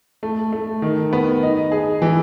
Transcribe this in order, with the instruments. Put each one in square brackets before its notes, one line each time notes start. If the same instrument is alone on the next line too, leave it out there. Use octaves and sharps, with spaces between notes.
[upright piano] A3
A3
D#3
B3
D#4
G#4
E3